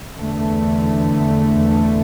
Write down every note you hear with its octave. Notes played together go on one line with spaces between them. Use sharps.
E2 D3 A3